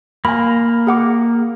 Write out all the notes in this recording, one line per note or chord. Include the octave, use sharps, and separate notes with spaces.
A#3 G#5 B5
G#4 F#5 D6